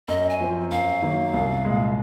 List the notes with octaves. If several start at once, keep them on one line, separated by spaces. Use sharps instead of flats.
F#2 D#5
G#5
F3 C4
F#2 F5
D#3 F#3 A#3
C2
A#2 G#3